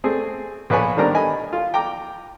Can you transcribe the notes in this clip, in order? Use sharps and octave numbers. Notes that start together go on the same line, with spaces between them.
A3 C4 G#4
A#1 B4 C#5 G#5
D#3 G3 D4 A#4 C5 A#5
D#5 G#5 B5
F4
G5 A#5 D6